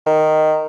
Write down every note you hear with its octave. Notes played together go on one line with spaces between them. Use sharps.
D#3